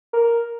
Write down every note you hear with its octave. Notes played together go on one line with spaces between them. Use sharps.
A#4